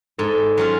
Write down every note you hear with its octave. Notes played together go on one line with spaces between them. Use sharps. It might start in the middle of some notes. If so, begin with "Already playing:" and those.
G#2 A4
F#3 C#4 F4